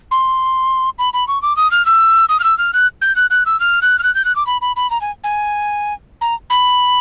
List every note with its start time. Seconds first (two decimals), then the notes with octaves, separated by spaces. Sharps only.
0.11 C6
0.99 B5
1.13 B5
1.28 C#6
1.42 D6
1.57 D#6
1.71 F6
1.86 E6
2.29 D#6
2.40 F6
2.44 E6
2.58 F6
2.73 F#6
3.02 G6
3.16 F#6
3.30 F#6
3.46 E6
3.60 F6
3.82 F#6
3.99 F6
4.03 F#6
4.15 G6
4.25 F#6
4.36 D6
4.47 B5
4.61 B5
4.76 B5
4.91 A#5
5.01 G#5
5.24 G#5
6.21 A#5
6.50 B5